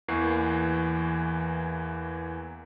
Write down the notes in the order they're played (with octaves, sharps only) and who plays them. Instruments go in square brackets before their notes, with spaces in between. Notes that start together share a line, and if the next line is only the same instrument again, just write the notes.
[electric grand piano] E2 E3 A#3 C#6 C7